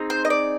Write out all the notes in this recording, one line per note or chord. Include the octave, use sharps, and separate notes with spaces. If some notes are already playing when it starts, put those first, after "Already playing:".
Already playing: C4 D#4 G#4
C5
D#5
D5